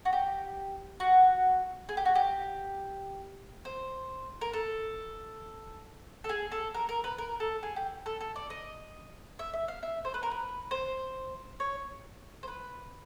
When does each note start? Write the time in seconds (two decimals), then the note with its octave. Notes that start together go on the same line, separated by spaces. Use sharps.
0.05 F#4
0.13 G4
1.00 F#4
1.89 G#4
1.97 G4
2.05 F#4
2.15 G4
3.65 C5
4.41 A#4
4.53 A4
6.24 A4
6.29 G#4
6.52 A4
6.74 A#4
6.89 A#4
7.04 B4
7.18 A#4
7.40 A4
7.63 G#4
7.76 G4
8.06 A4
8.21 A4
8.36 D5
8.50 D#5
9.39 E5
9.53 E5
9.68 F5
9.83 E5
10.05 C5
10.14 B4
10.23 A#4
10.31 B4
10.71 C5
11.60 C#5
12.43 C5
12.48 B4